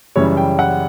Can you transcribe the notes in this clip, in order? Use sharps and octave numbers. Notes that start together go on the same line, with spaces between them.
F#2 C#3 E3 G3 C#5
G5
F#5